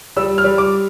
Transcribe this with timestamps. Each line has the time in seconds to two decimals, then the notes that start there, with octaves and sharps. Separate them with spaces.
0.16 G3 E6
0.38 F6
0.44 G3
0.58 D6